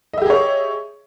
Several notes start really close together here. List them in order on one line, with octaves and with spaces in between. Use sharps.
D#5 E5 G4 G#4 C#5